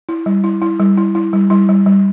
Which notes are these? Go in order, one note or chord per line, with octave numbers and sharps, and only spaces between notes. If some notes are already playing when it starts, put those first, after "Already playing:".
E4
G3
E4
E4
G3
E4
E4
G3
G3 E4
G3
G3